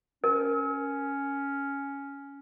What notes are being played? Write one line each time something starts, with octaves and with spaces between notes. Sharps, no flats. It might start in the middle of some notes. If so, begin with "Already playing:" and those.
C#4 A#4